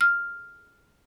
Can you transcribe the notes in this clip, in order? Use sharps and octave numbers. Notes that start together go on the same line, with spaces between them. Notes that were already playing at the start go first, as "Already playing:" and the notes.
F6